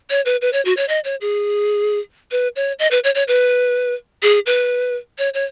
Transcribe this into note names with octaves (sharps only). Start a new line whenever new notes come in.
C#5
B4
B4
C#5
F#4
C#5
D#5
C#5
G#4
B4
C#5
D#5
B4
C#5
C#5
B4
G#4
B4
C#5
C#5